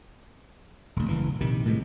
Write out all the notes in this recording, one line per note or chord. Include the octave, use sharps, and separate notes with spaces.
D#1 D2
F#1 E3
A#1 C3 D#3
A2 C3 G#3